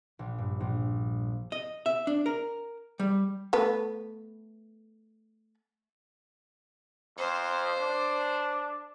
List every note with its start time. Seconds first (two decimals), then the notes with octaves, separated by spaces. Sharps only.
0.19 A#1
0.38 G2
0.60 A#1
1.52 D#5
1.86 E5
2.07 D4
2.26 A#4
2.99 G3
3.53 A3 B3 B4
7.17 F2 C5
7.80 D4